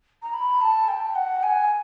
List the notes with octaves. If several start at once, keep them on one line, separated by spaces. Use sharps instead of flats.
A#5
B5
A5
G5
F#5
G#5